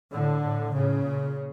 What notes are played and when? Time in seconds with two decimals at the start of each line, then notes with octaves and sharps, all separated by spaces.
0.12 A2 D3
0.43 A2
0.73 A2 C#3
1.03 A#2